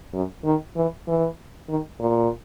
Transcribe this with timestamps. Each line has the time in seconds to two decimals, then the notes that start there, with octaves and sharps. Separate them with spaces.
0.14 F#2
0.45 D#3
0.76 E3
1.08 E3
1.69 D#3
2.00 A#2